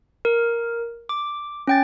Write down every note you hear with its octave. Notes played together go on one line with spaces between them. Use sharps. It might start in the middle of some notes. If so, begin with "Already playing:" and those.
A#4
D6
C#4 G5 A6